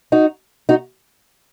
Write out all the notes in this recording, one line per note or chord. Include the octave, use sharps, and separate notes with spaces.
D#4 F#4
D#4 F#4